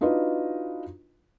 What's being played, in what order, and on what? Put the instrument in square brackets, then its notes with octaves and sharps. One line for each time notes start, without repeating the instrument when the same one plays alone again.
[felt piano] D4 D#4 F4 F#4 B4 D#5